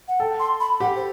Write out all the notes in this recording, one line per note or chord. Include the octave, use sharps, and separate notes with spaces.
F#5
A4 G5
C6
B5
G4 F#5
C5